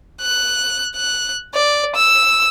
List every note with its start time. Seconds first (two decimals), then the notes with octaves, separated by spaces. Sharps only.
0.22 F#6
0.96 F#6
1.54 D5
1.96 E6